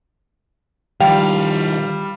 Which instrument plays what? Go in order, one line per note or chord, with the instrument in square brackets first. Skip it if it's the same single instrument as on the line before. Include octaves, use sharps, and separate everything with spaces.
[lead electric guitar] D#3 F3 [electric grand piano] G3 F5 [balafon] G5